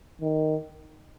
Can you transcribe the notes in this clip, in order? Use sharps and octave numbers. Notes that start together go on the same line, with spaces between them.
D#3